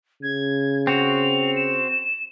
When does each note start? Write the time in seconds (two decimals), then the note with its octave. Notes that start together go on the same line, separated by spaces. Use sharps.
0.23 C#3 G#6
0.87 C4 F#4 F7
1.56 E7